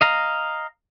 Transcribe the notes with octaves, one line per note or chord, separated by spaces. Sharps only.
D#5 F5 A#5